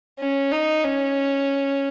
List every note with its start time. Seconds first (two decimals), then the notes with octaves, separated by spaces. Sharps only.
0.19 C#4
0.51 D#4
0.84 C#4